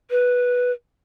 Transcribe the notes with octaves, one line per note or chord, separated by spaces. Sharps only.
B4